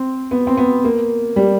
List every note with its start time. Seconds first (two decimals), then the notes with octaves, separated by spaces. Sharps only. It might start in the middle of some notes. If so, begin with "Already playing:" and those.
Already playing: C4
0.31 B3
0.47 C4
0.57 B3
0.84 A#3
1.36 G3